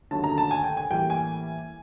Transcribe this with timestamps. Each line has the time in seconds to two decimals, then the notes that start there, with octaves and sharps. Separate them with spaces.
0.11 D#2 D3 F#3 A3 C#4 A5
0.24 A#5
0.38 A5
0.51 G#5
0.63 G5
0.77 G#5
0.90 A2 E3 G3 A#3 G5
1.10 G#5